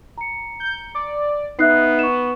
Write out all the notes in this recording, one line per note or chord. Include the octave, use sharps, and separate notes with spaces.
A#5 C#7
G6
D5
B3 D#4 E5 F#6 C7
C#6 E7